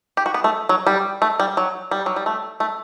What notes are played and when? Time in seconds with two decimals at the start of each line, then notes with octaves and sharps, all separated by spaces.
0.17 G4
0.26 F#4
0.34 B3
0.44 A3
0.69 F#3
0.87 G3
1.22 A3
1.40 G3
1.57 F#3
1.91 G3
2.06 F#3
2.16 G3
2.26 A3
2.60 A3